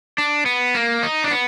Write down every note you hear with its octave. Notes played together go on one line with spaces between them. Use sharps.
D4
B3
A#3
D#4
D4
B3